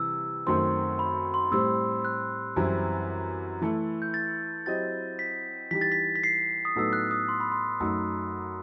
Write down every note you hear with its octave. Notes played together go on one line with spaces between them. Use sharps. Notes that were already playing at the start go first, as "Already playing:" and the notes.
Already playing: C3 E3 G3 E6
F#2 D#3 A3 C4 C6
B5
C6
A2 G3 C4 E6
F#6
F#2 E3 G3 C4 E4
E3 A3 E4 A4
G6
A6
F#3 C4 E4 G4 D#5 A6
B6
E3 G3 D#4 G4 B6
A6
B6
B6
C7
D#6
A2 F#3 B3 D#4 A4 E6
F#6
D#6
C6
B5
C6
F#2 F#3 A3 D#4 E6